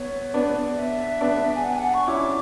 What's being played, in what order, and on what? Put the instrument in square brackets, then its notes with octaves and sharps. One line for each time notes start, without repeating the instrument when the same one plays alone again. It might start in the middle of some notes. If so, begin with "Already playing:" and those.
Already playing: [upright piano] B3 [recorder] C#5
[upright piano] B3 D4 [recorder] D5
[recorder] E5
[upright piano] B3 D4
[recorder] G#5
F#5
G#5
F#5
C#6
[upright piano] C#4 E4 [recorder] D6